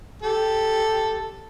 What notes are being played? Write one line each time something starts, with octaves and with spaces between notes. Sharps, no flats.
G4 A4